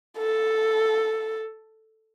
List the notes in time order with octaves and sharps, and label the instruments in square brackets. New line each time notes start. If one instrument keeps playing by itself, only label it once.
[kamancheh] A4